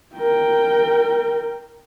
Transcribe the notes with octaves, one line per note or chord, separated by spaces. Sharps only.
A#4 G5